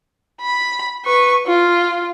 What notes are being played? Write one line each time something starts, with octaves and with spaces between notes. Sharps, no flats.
B5
B4 C#6
F4